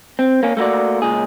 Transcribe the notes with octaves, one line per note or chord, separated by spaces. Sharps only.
C4
A#3 C#4
A3 A#3 F#4 D5
C#2 A#2 G#4